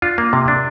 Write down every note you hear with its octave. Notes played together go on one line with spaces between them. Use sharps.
D4 F4
A#3
C3
D4